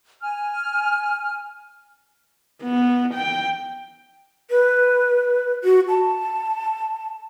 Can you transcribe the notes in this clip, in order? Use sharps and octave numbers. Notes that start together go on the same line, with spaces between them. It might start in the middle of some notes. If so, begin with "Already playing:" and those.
G#5 F6
B3
G5
B4
F#4
A5